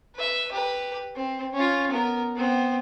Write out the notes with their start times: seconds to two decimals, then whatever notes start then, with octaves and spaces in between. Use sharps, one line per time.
0.16 B4 E5
0.52 G4 B4
1.15 C4
1.54 C#4 F4
1.91 B3 A#4
2.36 B3 C4